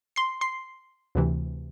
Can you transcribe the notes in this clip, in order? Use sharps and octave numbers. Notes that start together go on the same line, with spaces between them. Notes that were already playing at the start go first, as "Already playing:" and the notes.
C6 C7
C6 C7
D2 C3 E3